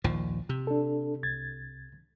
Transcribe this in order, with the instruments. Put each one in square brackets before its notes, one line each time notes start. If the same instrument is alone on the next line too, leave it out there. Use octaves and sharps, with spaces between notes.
[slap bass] A#1 D#2 F3
C3
[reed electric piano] D4 A4
C2 G#6 A6